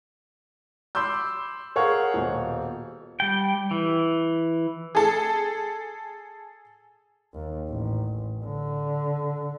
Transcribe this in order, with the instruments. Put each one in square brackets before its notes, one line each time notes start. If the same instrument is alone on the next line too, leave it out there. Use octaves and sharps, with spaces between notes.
[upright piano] B5 C6 D6 E6 G6
G#4 A#4 C#5 F5 F#5
D#1 B2
[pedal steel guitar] G3 G5
E3
[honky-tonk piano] G#4 A4
[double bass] D#2
A1
D3